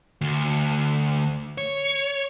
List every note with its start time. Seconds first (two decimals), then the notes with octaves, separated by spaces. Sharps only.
0.21 D2
1.58 C#5